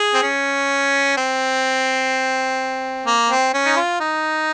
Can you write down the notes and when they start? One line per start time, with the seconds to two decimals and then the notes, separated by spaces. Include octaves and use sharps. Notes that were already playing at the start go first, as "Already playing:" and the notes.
Already playing: G#4
0.14 C4
0.23 C#4
1.17 C4
3.06 A#3
3.30 C4
3.53 C#4
3.65 D#4
3.76 F4
4.00 D#4